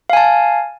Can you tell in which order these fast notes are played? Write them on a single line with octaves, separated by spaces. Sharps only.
F5 G#5 A5